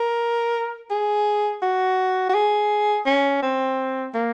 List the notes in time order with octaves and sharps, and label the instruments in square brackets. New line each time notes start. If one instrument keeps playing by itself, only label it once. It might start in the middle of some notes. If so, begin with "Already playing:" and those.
Already playing: [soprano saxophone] A#4
G#4
F#4
F#4
G#4
C#4
C4
A#3